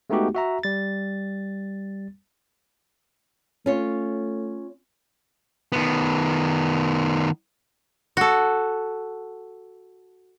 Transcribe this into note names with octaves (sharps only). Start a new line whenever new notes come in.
G#3 A3 B3 D#4 F#4 G4
F#4 E5 A#5
G3 A6
A3 C#4 F4 C#5
D#3 B3
F#4 A4